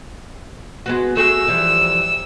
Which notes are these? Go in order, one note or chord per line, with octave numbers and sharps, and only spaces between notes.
G#3 B3 F#4
A3 F#4 G#4 E6
E3 F3 G3